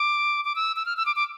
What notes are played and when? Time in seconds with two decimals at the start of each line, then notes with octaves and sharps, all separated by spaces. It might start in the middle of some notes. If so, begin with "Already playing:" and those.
Already playing: D6
0.45 D6
0.56 E6
0.76 E6
0.86 F6
0.97 E6
1.06 D6
1.16 D6